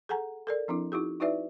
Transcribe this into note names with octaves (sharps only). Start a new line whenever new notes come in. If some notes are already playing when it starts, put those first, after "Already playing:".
G#4 A4 F#5 G#5 A#5
A4 A#4 D5
F3 C4 D4 E4
D#4 E4 F#4 G#4
D#4 E4 F#4 B4 D5 E5